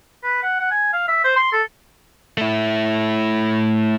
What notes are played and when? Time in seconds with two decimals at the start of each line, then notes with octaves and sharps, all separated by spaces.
0.24 B4
0.43 F#5
0.60 F#5
0.71 G#5
0.93 F5
1.08 E5
1.24 C5
1.36 C6
1.52 A4
2.38 A3 E4